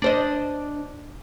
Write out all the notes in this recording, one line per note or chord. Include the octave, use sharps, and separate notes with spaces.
D4 C5 D#5